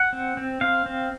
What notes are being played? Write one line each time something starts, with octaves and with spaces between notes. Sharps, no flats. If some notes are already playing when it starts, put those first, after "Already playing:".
Already playing: F#5
C4
C4
C4 F5
C4